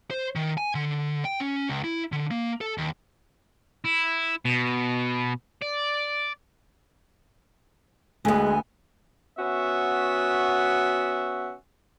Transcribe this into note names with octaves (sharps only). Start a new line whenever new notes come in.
C5
D#3
G#5
D3
G5
C#4
C#2
E4
D3
A#3
A4
D#2
E4
B2
D5
D2 G#3 B3 G#5
B3 C#4 F#4 E5